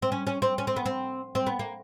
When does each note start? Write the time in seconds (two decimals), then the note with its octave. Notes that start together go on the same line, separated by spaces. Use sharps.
0.02 C4
0.12 C#4
0.27 C#4
0.42 C4
0.58 C#4
0.67 C4
0.76 B3
0.86 C4
1.35 C4
1.47 B3
1.59 A#3